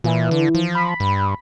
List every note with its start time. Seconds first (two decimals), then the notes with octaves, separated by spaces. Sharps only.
0.04 A#2 E3
0.31 D3
0.55 F3
0.75 B5
1.00 G2